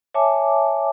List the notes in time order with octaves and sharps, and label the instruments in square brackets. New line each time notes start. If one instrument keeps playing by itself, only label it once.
[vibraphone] C#5 E5 G#5 A5 D6